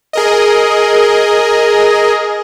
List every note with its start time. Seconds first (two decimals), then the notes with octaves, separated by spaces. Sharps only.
0.13 G#4 A#4 D#5